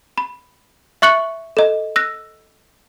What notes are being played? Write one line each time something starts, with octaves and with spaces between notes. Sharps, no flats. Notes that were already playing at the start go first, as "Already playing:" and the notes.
B5
E5 C#6 F#6 C#7 F#7
A4 D#5
E6 F#6 A#6